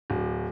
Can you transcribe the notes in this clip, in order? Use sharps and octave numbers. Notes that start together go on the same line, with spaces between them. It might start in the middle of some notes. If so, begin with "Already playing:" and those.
D1